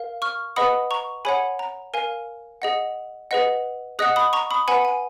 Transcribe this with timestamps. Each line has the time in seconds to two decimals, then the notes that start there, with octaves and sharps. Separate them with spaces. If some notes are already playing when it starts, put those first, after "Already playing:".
Already playing: A#4 F5
0.22 C#6 F6
0.56 G#4 B4 D#5 F#5 B5 D#6
0.91 A#5 C#6
1.25 G#4 C#5 F#5 G#5 B5
1.59 A#5
1.94 A#4 F5 G#5
2.62 G#4 D#5 F#5
3.31 G#4 B4 D#5 F#5
3.99 G#4 D#5 F#5 D#6 F#6
4.16 B5 D#6
4.33 A#5 C#6
4.51 B5 D#6
4.68 B4 F#5 G#5 B5
4.85 G#5